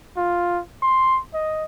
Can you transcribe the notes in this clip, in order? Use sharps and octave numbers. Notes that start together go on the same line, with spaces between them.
F4
C6
D#5